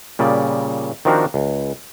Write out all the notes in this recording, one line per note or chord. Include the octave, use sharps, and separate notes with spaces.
A#2 C#3 G3 D5
D#3 F3 C4 D4 F#4 A#4
C#2